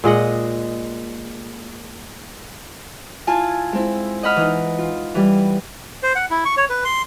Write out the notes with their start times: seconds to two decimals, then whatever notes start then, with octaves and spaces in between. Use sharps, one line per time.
0.04 A#2 G#3 D#5 F#5
3.27 E4 F4 G#5 A5
3.73 G#3 C4 E4
4.23 D#5 F#5 B5 F6
4.36 E3 D#4
4.78 F4
5.15 E3 G3
6.03 C5
6.15 F#5
6.31 E4
6.45 C#6
6.57 C#5
6.70 B4
6.85 C6